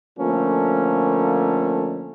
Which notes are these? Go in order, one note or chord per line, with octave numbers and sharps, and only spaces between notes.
D3 F3 A3 A#3 C#4